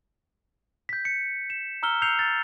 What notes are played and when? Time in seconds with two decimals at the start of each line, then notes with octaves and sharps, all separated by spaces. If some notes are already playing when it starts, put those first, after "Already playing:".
0.89 G6 B6
1.05 C#7
1.50 E7
1.83 A#5 E6 F6 G7
2.02 E6 G6 C7 C#7 F7
2.19 A6